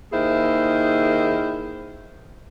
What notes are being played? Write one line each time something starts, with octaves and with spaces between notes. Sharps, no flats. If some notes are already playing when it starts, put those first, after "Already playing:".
D#2 D#3 E4 G#4 C5